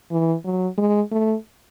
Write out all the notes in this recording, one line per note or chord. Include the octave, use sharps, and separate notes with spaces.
E3
F#3
G#3
A3